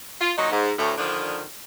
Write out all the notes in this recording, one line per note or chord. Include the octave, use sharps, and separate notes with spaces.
F4
A#2 F#3 D#4
G#2
D2 A2
D3 D#3 F3 D4